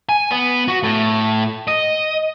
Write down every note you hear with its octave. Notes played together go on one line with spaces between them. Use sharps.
G#5
B3
F#4
A2
D#5